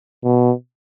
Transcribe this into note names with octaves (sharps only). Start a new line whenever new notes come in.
B2